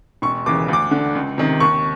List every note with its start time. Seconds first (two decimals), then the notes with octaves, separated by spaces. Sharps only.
0.22 E1 C#6
0.46 D#2 C#3 E3 D6
0.68 D2 D6
0.91 D3
1.15 C#2
1.38 C3 D#3
1.60 D#2 C#6